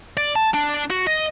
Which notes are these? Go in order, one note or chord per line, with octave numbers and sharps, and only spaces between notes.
D5
A5
D4
F#4
D#5